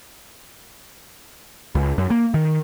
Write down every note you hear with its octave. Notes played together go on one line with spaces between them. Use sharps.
C#2
F#2
A#3
D#3